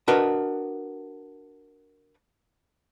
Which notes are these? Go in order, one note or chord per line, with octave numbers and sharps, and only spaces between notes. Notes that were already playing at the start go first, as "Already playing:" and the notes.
D4 F#4 A#4 B4 D#5